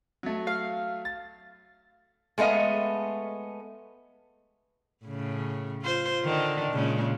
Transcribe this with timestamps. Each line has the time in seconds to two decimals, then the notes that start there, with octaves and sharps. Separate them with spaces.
0.23 F#3 A3
0.47 F5
1.05 A6
2.38 G#3 A3 B3 D#5 F5
5.05 A2 C#3
5.82 F4 C5
6.23 D3 D#3 D4
6.72 A#2 C#3 G#3